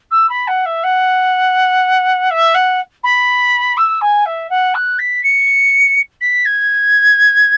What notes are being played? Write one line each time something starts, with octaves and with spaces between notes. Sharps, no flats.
E6
B5
F#5
E5
F#5
E5
F#5
B5
E6
G#5
E5
F#5
F#6
B6
C#7
B6
G#6